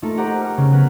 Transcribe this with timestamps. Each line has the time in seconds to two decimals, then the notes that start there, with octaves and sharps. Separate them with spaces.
0.02 A3 A#3 D#4 F4 A4
0.17 G4 C5 D#5 F#5 A#5
0.41 F6
0.57 C#3
0.71 F#3 B3 A#4 B4